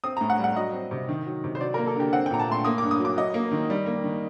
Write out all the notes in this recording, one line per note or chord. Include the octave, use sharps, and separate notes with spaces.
C4 D#6
A#5
A2
F#5
G3
F#5
F#3 D#5
C4
C3
D#3
F#3
C3
C5
F#3 D5
A#3 A#4
A4
D3 G4
C4 F#5
G5
A#2 A#5
A5
A3 C6
A#3 D#6
D6
G2
D#6
F#3
D6
F#3 D#5
A#3
D#3
G3
A#3
D#3